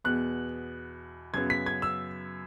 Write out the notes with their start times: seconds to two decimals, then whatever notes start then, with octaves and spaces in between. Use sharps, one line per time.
0.04 E2 B2 B3 F#6
1.34 F#2 C#3 F#3 B3 G#6
1.50 B6
1.66 G#6
1.82 E6